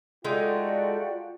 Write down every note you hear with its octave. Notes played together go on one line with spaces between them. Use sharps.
G#3 A3 D#4 F4 F#4 D5 G5